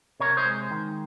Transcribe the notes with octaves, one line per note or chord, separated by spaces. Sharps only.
C3 A#4 C#5
C5 D#5
G#3
D#3